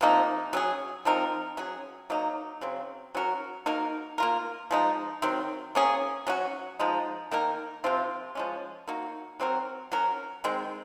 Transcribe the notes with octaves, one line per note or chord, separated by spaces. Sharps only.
C3 F3 A#3 D#4
F#3 C#4 G#4
F3 C4 D#4 A#4
F#3 C#4 G#4
F#3 A#3 D#4
C#3 F#3 C4
F#3 C#4 F#4 A#4
A#3 D#4 F#4 A#4
A#3 F4 A#4
F3 G#3 D#4
D#3 F#3 C4
A#3 C#4 G#4
F#3 C#4 F#4
F3 G#3 D#4
D#3 A#3 D#4 A#4
C3 F3 C4 F4
F3 G#3 C#4
A#3 D#4 F#4
F#3 C4 F#4 A#4
F#3 C#4 F#4 A#4
D#3 G#3 C4